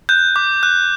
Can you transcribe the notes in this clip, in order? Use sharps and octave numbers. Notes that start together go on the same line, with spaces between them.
F#6 G6
D6
F#6